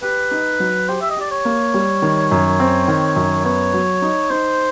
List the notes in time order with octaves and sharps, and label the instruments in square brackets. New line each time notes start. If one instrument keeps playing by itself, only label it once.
[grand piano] G4 [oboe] B4
[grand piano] D#4
F#3
[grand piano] G4 [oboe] C5
[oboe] E5
D#5
[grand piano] G4 [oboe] D5
[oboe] C#5
[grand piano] A#3
G3
D#3
F#2
C4
D#3
F#2
[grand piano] B3 [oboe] C#5
[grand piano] F#3
D#4
[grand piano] D#4 [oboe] C5